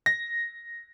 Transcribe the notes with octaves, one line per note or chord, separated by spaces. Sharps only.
A#6